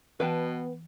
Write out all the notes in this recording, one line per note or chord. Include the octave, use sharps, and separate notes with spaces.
B2 E3 B3 B4 G5 A5